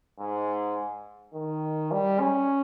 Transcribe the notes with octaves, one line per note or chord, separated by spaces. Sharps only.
G#2
D#3
G3
C#4